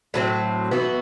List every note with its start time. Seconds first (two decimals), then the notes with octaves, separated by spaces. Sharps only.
0.14 A2 F#3 C4
0.71 E3 B3 F#4